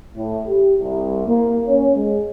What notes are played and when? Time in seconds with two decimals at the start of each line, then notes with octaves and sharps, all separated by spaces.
0.16 A2
0.47 G4
0.79 C2
1.27 A#3
1.66 C#4
1.95 G#3